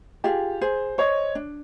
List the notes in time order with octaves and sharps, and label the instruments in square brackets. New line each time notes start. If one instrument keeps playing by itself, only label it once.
[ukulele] F4 G#4 [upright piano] G4
[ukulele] G#4 [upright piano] C5
[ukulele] C5 D#5 [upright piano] C#5
[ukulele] D4